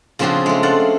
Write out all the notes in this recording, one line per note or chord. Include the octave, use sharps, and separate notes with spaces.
C#3 F3 C4 D4 F#4 G#4
G#3 A3
F4 A4 D5 F#5